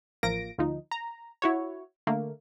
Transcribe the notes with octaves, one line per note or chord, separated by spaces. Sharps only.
A1 F3 A#3 A#6 D7
D2 F3 D#4
A#5
E4 F#4 C#5
D3 A3 A#3